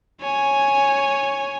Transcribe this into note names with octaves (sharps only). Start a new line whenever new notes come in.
C#5 G#5